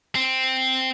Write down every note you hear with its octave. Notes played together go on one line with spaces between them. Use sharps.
C4